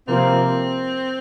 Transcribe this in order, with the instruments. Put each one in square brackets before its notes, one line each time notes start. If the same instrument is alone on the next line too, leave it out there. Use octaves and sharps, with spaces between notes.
[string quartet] C3 F3 A#3 [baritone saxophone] C4